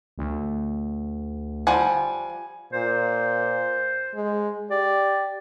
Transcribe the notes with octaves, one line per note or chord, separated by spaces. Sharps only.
D2
F3 G3 F#5 G#5
A#2 C5
G#3
G4 D5